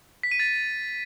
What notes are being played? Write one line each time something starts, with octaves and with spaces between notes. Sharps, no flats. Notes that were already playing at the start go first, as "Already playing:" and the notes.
B6
D#7
A6